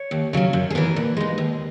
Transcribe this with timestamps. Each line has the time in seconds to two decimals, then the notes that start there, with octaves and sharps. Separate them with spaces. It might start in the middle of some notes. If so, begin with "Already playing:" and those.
Already playing: C#5
0.11 D#2
0.33 C#3 F#3 C#4
0.53 F#2
0.70 G#4
0.75 E3 B3 A#4
0.96 A#2 B4
1.17 G#3 D#4
1.38 D#2